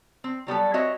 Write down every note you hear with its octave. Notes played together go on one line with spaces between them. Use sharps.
C4
F#3 G3 B3 A4
C4 F#4 C#5 D#5 E5